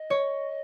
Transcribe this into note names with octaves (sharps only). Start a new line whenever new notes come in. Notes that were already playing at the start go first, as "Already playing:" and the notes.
Already playing: D#5
C#5